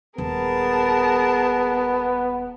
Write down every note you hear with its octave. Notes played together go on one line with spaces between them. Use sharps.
D#1 B3 G#4 A#4 A5